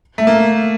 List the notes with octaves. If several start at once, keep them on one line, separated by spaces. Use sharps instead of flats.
A3
A#3